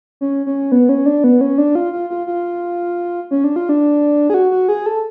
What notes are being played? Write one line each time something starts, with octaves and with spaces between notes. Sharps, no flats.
C#4
C#4
B3
C#4
D4
B3
C#4
D4
F4
F4
F4
F4
C#4
D4
F4
D4
G#4
F#4
F#4
G#4
A4